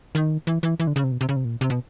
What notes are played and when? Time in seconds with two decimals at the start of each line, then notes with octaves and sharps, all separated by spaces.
0.15 D#3
0.47 E3
0.63 E3
0.80 E3
0.87 D3
0.96 C#3
1.04 C3
1.12 B2
1.21 C3
1.29 C#3
1.36 C3
1.45 A#2
1.61 C3
1.70 B2